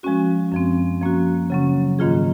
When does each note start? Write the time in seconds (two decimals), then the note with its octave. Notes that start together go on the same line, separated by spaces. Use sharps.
0.03 F3 G#3 C#4 F#4
0.52 F#2 F3 C4
1.01 F3 A#3 C#4 F#4
1.50 C#3 F#3 C#4
1.99 G#2 D#3 A#3 F4 G#4